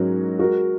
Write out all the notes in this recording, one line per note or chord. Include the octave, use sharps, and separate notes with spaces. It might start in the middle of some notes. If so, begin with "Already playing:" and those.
Already playing: G#2 F#3 C#4 F#4 A#4
G#3 F#4 A#4